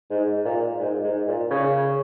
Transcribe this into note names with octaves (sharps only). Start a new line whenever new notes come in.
G#2
A#2
G#2
G#2
A#2
C#3